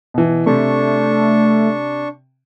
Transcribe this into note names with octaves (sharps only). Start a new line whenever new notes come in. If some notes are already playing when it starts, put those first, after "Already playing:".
B2 E3
C3 A3 D4 C#6